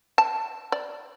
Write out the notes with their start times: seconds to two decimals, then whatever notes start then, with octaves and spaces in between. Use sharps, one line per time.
0.18 A5
0.72 D5